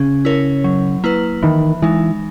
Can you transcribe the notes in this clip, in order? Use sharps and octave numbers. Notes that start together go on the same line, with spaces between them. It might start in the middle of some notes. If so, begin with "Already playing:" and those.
Already playing: C#3 C#4
E4 A#4 C#5
F#3
A#3 E4 B4
D#3 E3
E3 G#3 D#4